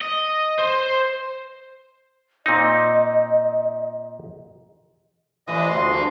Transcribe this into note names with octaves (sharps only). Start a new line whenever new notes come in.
D#5
C5 C6
A#2 C4 D#4 D#5
A2 C3 E3 D#5 D#6
D2 C6
G2 C3 A#3